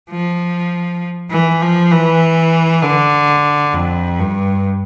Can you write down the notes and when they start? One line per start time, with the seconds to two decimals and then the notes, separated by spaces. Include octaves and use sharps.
0.10 F3
1.31 E3
1.62 F3
1.92 E3
2.83 D3
3.74 F2
4.19 G2